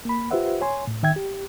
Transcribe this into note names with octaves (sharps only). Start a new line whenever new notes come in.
A#3 B5
F4 G4 B4 C5 E5 F#5
C#5 G#5 C6
A2
D#3 E5 G5 G#6
G4